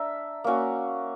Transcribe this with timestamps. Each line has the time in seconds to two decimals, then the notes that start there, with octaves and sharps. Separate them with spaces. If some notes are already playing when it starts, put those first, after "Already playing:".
Already playing: D4 A#4 E5
0.44 A#3 C#4 F#4